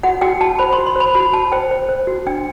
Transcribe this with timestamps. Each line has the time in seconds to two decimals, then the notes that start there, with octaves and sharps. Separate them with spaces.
0.03 F#4 F#5
0.21 F#4 G5
0.41 F#4 A5
0.58 C5 B5
0.73 C6
0.78 F#4
0.86 C6
0.96 C5 B5
1.15 F#4 B5
1.33 F#4 A5
1.52 C5 G5
1.71 C5
1.89 C5
2.07 F#4
2.27 D4 G5